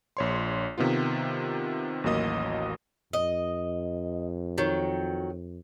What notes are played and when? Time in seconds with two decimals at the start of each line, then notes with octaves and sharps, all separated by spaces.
0.17 A#1 C#5 C6
0.78 C3 D#3 B3 F4
2.04 A1 D#2 F#3 A#3 D#5 D#6
3.13 F2 D#5
4.58 D#3 F#3